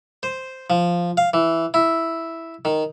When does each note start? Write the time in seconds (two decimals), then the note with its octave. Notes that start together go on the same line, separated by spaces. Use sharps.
0.23 C5
0.70 F3
1.17 F5
1.34 E3
1.74 E4
2.65 D#3